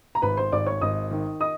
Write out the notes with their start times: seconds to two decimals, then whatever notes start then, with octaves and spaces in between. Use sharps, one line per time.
0.15 A#5
0.22 G#1 B4 B5
0.37 C5 C6
0.52 G#1 D5 D6
0.67 C#5 C#6
0.82 G#1 D#5 D#6
1.11 D#3
1.40 D#5 D#6